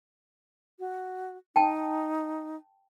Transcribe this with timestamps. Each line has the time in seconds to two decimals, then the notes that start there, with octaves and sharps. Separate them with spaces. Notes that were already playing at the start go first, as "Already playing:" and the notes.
0.79 F#4
1.56 D#4 G5 A5